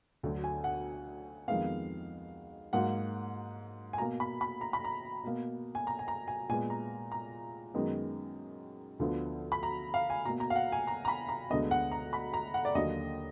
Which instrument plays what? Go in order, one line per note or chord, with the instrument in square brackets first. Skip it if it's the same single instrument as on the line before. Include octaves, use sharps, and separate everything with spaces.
[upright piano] D2 D3 F#3
G#5
F#5
F2 D#3 G#3 B3 F5
G#2 F#3 A#3 F#5
G#5
B2 A#3 A#5
B5
B5
A#5
B5
A#5
B2 A#3
G#5
A#5
G#5
A#5
G#5
A#2 G#3 B3 G#5
A#5
A#5
F#2 D#3 G#3 B3
D2 D3 F3 B3
B5
A#5
F5
G#5
B2 A#5
A#3
A#5
F5
F#5
G#5
A#5
A#5
B5
A#5
D2 D3 G#3 B3 D#5
F#5
A#5
B5
A#5
F#5
D5
D#2 D3 F#3 A#3 D#5